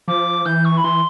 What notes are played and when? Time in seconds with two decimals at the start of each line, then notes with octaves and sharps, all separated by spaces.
0.08 F3 D6
0.46 E3 G6
0.65 C#6
0.77 B5
0.84 E3 C6